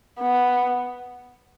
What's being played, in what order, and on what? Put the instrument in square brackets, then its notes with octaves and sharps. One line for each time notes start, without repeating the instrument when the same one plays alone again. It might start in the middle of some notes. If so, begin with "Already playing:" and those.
[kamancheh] B3